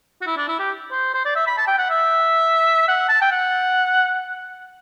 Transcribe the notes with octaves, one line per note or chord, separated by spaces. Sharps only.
F#4
E4
D4
E4
G4
C5
C5
D5
E5
B5
A5
G5
F#5
E5
F#5
A5
G5
F#5